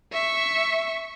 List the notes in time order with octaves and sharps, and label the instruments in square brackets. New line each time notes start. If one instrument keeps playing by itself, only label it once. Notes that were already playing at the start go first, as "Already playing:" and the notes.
[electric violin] E5 C#6